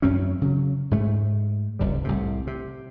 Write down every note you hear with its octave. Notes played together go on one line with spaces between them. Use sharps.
F#2 F#3 C4 C#4
C#3 F#3
G#2 G#3 A3
F1 C#2 G3
C2 A2 C3
C3